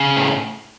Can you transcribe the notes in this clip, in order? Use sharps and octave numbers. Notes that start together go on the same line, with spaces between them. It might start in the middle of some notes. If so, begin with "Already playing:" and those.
Already playing: C#3
A2